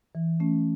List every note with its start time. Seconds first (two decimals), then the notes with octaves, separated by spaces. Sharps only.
0.15 E3
0.40 A3 C#4